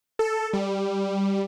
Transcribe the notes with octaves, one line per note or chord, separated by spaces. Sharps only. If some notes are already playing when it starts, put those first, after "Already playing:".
A4
G3